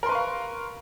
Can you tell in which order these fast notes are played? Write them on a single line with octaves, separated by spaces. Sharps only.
A#4 C6 B4 C#6 F5